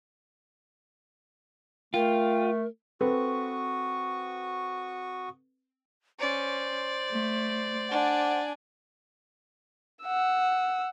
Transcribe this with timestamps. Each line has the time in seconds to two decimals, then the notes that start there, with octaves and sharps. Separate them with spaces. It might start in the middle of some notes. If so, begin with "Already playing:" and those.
1.94 A3 F4 A#4 G5
3.01 C4 F#4 A4 B4 C#6 D#6
6.20 C#4 C5 D5
7.10 A3
7.90 D4 F#5 G#5
10.03 F#5 E6